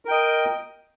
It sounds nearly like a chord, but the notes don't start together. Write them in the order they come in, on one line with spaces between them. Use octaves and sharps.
A#4 G5 D#5